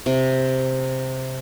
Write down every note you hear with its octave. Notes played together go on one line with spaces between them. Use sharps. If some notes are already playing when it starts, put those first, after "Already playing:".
C3